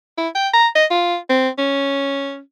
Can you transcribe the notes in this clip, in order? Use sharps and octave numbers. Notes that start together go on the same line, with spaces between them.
E4
G5
A#5
D#5
F4
C4
C#4